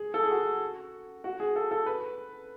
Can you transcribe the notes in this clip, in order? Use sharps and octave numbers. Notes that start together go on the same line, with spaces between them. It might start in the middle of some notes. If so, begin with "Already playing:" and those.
Already playing: G#4
A4
G#4
F#4
F#4
G#4
A4
A4
B4